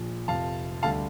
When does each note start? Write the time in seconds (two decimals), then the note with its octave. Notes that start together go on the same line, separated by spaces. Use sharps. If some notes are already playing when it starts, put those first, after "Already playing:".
Already playing: A#1 A#2 F3
0.28 F1 F2 C3 F3 F5 A5
0.83 D2 D3 G3 F5 A5